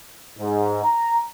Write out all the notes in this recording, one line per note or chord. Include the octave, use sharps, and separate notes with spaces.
G#2
A#5